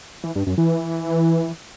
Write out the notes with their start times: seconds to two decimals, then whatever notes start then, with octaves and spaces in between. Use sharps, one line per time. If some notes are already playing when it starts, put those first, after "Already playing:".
0.24 E3
0.36 G2
0.47 F#2
0.58 E3